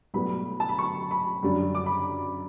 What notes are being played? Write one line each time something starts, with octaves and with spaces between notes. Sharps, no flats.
B1 A2 G3 B3 B5
A5
B5
C#6
B5
F#2 D3 G3 D4
D6
B5